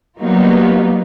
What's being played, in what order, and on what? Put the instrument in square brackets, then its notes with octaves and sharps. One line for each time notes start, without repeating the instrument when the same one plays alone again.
[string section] F#3 G3 A#3 B3 D#4 F4